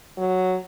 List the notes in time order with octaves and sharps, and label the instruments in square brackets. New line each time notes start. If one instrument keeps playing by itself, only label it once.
[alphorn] F#3